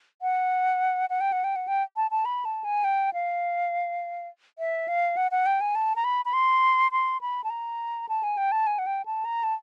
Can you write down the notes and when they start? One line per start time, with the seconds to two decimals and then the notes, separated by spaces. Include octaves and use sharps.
0.22 F#5
1.10 F#5
1.21 G5
1.32 F#5
1.44 G5
1.56 F#5
1.68 G5
1.96 A5
2.11 A5
2.25 B5
2.45 A5
2.64 G#5
2.84 G5
3.13 F5
4.59 E5
4.88 F5
5.17 F#5
5.31 F#5
5.46 G5
5.61 G#5
5.75 A5
5.96 A#5
6.04 B5
6.25 B5
6.33 C6
6.92 C6
7.21 B5
7.44 A5
7.50 A#5
8.09 A5
8.23 G#5
8.37 G5
8.52 A5
8.67 G#5
8.79 F#5
8.86 G5
9.06 A5
9.25 A#5
9.43 A5